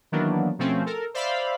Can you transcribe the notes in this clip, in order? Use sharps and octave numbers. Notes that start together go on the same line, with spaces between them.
D#3 E3 F#3 A#3 B3 D4
B2 F3 A3 C4 C#4
A4 A#4
C5 D5 E5 F5 B5